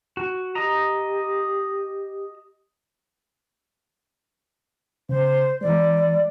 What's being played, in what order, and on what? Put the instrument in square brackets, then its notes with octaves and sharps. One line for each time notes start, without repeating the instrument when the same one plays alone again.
[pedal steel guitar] F#4
[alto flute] G4 [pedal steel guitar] D#5 A#5
[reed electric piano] C#3 [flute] C5
[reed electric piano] E3 G#3 [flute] D5